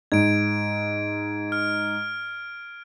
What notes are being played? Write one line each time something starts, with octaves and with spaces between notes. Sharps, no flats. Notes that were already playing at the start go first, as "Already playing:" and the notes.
G#2 G#6 D7
F6